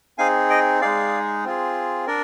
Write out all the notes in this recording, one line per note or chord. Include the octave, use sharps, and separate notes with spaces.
C4 D#4 G#4 F5 G#5
D#5 G5
G#3 D#4 G#4 D5 F5
C4 F4 G#4
D4 A#4 D5